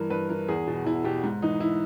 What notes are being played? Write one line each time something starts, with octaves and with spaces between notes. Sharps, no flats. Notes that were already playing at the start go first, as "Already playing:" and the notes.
Already playing: G2 E3 A#4
G2 B4
E3 A#4
E2 G#4
B2
E2 E4
B2 G4
G#2
E3 D#4
E4